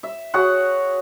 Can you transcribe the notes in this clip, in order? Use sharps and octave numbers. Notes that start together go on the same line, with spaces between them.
E5
F#4 G#4 C#5 F#5